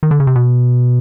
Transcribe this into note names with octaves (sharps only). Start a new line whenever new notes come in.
D#3
D3
C#3
C3
B2